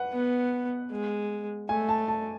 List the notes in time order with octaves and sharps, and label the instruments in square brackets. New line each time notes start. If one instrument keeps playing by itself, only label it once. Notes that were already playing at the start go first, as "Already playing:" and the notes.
Already playing: [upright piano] B4 F#5
[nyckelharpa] B3
G#3
[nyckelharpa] A3 [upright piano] G#5
[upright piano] A5
A5